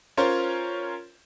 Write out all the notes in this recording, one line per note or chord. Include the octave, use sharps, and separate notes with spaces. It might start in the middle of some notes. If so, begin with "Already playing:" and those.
C#4 F4 A#4 C5 C#5